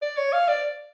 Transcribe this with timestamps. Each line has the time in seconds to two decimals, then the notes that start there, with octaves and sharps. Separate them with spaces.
0.02 D5
0.17 C#5
0.33 F5
0.48 D5